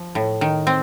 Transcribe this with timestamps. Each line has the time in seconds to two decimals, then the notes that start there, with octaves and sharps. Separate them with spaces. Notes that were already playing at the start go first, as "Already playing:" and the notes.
Already playing: F3
0.15 A2
0.41 D#3
0.67 C4